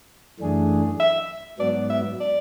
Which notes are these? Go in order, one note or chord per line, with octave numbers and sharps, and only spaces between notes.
F#2 E3 A3 D4 G#4
E5
G#2 F#3 B3 D5
E5
D5